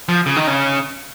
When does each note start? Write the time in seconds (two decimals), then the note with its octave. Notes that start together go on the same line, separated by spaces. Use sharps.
0.09 F3
0.26 C#3
0.36 D#3
0.47 C#3